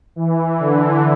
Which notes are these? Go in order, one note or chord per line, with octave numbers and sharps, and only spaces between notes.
E3
D3